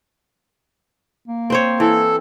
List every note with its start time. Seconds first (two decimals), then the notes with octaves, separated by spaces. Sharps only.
1.28 A#3
1.50 C4 C5 C#5
1.80 E3 A4